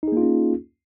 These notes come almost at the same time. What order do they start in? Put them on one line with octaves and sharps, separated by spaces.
D#4 G#4 A#3 F4 C#4